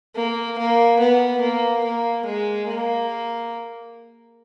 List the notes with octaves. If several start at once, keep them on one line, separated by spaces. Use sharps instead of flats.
A#3
A#3
B3
A#3
A#3
G#3
A#3